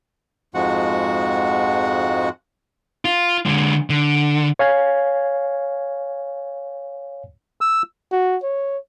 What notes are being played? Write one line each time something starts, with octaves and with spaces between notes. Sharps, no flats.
F2 G#2 F3 G#3 F#4 F#5
F4
D3 G#3
D3
C#5 F5 G#5 G#6
E6
F#4
C#5